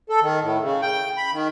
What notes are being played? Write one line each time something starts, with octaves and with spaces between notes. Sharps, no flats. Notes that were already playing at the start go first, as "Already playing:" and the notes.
A4
D#3
A2
C#3
G5
B5
D#3